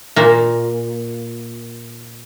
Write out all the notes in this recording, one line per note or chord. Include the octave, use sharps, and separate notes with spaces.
A#2 A#3